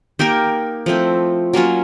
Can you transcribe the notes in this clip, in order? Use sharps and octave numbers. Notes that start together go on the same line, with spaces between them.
A#3 D#4 G4 A#4
F3 A3 C4 E4
F#3 A#3 C#4 F4